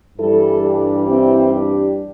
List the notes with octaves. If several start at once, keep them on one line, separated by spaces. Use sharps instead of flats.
G2 E3 G3 E4 A4
D4 G4
C4 E4
D4 G4